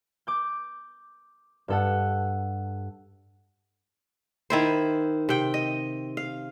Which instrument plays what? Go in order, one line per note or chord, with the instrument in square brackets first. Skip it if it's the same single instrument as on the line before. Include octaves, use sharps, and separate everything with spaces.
[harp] D6 G6
G2 A4 F#5
[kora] D#3 E4 C5
C3 G5
D#5
F5